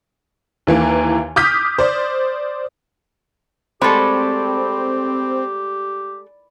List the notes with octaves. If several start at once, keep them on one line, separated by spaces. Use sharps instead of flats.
D#2 E3 A#3
D6 D#6 F6 G6 B6
C5 D5
G#3 A3 C4 G4 A4 D5 B5